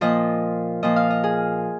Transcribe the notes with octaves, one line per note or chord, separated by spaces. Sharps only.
A#2 F3 D#5
A#2 F3 D#5
F5
D#5
G#4